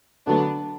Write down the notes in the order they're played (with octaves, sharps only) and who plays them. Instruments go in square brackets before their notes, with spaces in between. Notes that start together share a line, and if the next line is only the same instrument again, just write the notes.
[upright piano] D3 F#3 A3 [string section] B3 D4